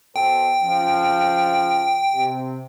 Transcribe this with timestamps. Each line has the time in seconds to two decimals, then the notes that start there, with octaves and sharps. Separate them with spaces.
0.16 B2 A4 C5 G5
0.63 C#3 F3
2.13 C3